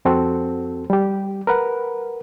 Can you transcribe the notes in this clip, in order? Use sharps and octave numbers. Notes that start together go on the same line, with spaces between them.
F2 C4 F#4 A4
G3 G4
A#4 B4 F#5